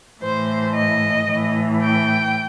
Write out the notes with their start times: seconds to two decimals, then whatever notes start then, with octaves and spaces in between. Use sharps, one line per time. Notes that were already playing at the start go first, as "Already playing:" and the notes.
0.22 A2 E3 C5
0.75 D#5
1.27 A2 E3
1.81 G5